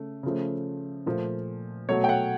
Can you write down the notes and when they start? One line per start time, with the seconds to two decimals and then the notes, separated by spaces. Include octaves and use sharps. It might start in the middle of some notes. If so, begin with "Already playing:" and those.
Already playing: C#3 A3
0.23 C#3 F3 A3
1.06 A#2 F3 A3
1.89 B2 F#3 A3 C#5
2.04 G5
2.09 F#5